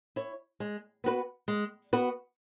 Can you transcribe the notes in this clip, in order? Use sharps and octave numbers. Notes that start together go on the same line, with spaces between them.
E4 C#5
G#3
B3 F#4 B4
G#3
B3 F#4 B4